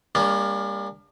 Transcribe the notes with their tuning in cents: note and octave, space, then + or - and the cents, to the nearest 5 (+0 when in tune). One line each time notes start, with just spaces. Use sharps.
G3 +40 A#3 +0 D4 -30